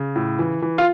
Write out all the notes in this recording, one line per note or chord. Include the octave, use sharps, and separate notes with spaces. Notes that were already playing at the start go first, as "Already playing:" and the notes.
Already playing: C#3
A2
E3
E3
F4